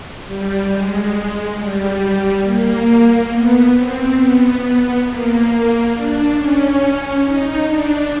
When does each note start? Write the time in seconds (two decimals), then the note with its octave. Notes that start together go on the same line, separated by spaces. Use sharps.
0.25 G3
0.69 G#3
1.56 G3
2.43 A#3
3.30 B3
3.74 C4
4.17 B3
5.04 A#3
5.92 D4
6.35 C#4
7.23 D#4
7.67 D4